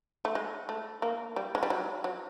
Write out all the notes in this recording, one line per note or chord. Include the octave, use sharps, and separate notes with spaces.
A3
G#3
A3
A#3
G3
G#3
G3
F#3
F#3